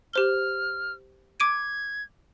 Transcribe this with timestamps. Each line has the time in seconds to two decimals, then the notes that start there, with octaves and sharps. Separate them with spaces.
0.13 G4 C5 F6 G7
1.40 D6 G#6 D7 D#7